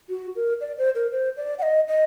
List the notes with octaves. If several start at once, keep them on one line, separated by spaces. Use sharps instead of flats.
F#4
A#4
D5
C5
A#4
C5
D5
F#5
D#5
D#5